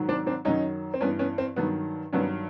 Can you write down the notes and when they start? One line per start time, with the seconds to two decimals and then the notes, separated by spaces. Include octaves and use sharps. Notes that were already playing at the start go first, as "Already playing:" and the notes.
Already playing: G#2 D#3 F#3
0.09 C4 D4
0.26 C4 D4
0.45 F#2 D#3 F#3 C#4 D#4
0.94 C4
1.01 G2 E3 B3 C#4
1.19 B3 C#4
1.38 C4
1.56 G2 D#3 F#3 B3
2.13 G2 D#3 F#3 B3 C#4